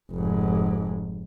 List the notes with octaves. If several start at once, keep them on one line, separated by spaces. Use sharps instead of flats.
F1 G#2